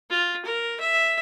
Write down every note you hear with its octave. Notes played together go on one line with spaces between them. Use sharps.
F4
A#4
E5